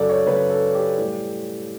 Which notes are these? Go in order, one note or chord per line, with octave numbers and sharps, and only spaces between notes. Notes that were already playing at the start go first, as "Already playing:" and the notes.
Already playing: F#2 C#3 F#3 A4 D5
C#5
F#2 C#3 F#3 B4
A4
G4
A2 G3